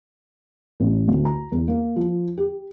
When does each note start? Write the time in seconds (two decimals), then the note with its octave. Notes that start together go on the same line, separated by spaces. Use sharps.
0.80 A1
1.08 D2
1.25 A#5
1.52 E2
1.68 A#3
1.96 F3
2.37 G4